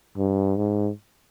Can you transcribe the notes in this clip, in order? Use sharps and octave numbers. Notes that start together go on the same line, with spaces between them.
G2
G#2